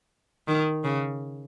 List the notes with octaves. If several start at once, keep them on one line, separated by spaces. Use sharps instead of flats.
D#3
C#3